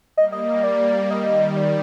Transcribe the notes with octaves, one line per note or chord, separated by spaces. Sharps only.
G3 A#3 D#5
D#5
D5
D#3 G3 D#5
D5